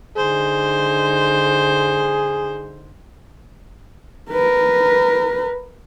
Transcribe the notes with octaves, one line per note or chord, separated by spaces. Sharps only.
D3 D#4 G#4 C5
A#4 B4